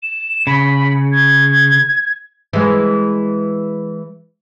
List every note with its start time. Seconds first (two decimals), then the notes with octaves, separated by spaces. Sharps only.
0.03 E7
0.47 C#3 B5
1.12 G#6
2.53 E3 G#3